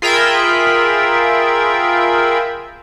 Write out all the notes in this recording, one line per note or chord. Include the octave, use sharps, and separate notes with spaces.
F4 G#4 A#4 E5 G5 B5